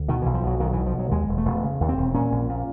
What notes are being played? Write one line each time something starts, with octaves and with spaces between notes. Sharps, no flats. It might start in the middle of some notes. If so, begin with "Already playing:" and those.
Already playing: D2
B2 D#3
B1 E3
F3
B2 F#3
B1 D#3
B2 E3
F3
B1
F#3
D#2 G#3
E1
A3
E1
C#3
D#2
C4
E1
A#2 C#4
A#1
A#2